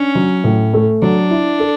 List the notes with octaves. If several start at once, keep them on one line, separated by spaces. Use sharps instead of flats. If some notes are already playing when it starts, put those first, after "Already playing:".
Already playing: C#4 D4
F#3
A2
A3
F#3 D4
E4
A4